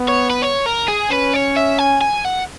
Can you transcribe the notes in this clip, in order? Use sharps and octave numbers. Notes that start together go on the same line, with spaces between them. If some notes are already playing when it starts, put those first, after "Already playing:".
Already playing: B3
C#5
B4
C#5
A#4
G#4
C#4 B4
C#5
E5
G#5
G#5
F#5